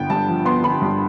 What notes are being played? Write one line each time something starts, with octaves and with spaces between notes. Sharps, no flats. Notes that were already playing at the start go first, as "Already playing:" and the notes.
Already playing: G1 B3 G5
G2 A5
F3
B3 C6
G1 B5
G2